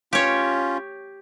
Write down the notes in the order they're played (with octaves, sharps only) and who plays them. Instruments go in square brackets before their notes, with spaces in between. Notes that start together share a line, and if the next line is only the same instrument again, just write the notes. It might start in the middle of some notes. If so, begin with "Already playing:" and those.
[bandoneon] C#4 F4 [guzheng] G4 C#5